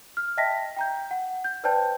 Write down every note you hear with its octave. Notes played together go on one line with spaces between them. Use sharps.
F6
D#5 E5 G5 A5 A#6 B6
G5 A#5 G6
F#5
G6
B4 C5 D5 G5 A5 G6